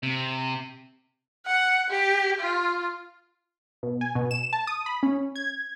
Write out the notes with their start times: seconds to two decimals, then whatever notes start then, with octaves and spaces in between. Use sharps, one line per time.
0.03 C3
1.47 F#5
1.90 G4
2.40 F4
3.83 B2
4.01 G#5
4.15 B2
4.31 E7
4.53 A5
4.67 D#6
4.86 B5
5.03 C#4
5.35 G#6